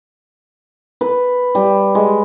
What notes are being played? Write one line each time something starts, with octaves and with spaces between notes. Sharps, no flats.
B4
G3
G#3